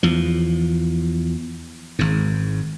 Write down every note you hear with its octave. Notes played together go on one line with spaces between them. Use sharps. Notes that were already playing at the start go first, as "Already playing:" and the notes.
E2 F3
G#1 G#2